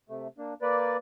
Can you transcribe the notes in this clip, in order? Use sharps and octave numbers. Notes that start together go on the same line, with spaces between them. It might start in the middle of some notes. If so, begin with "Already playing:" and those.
C3 A3
A#3 D4
A#3 B4 D5